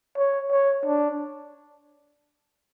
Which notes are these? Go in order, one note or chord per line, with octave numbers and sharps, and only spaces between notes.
C#5
C#5
D4